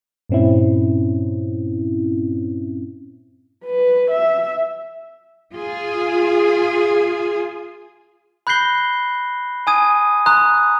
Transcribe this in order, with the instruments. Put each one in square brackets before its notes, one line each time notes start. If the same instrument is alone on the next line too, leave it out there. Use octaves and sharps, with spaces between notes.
[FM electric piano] G2 A#2 C4 C#4 E4
[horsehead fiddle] B4
E5
[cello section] F4 G#4
[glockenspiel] B5 F#6 G6 A#6 C7 G7
G#5 A5 D#6 G#6 D#7
A#5 C6 D#6 F#6